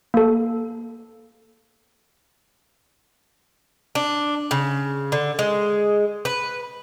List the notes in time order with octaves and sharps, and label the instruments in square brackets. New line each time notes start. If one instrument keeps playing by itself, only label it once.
[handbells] A#3 A4
[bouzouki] D4
C#3
D3
G#3
B4